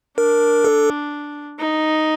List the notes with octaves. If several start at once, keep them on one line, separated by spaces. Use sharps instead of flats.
D4 A#4
A4
D#4